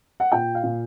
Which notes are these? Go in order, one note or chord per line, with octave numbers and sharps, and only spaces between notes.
F#5
A#2 G5
F5
A#2